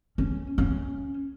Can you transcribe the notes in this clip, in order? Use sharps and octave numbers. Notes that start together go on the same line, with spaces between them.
C#4
C#4